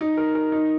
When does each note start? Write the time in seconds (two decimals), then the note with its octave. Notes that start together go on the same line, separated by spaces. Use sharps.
0.01 D#4
0.17 A#4
0.35 A#4
0.52 D#4